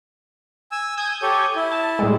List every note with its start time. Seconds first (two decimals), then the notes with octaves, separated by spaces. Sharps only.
0.72 G#5 E6
0.97 G#5 D#6 G6 G#6
1.22 G4 A4 C#5
1.56 E4
1.72 A5
1.99 A2 G3 G#3